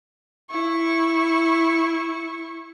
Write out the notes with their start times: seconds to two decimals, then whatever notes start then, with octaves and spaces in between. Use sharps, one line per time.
0.51 E4 C#6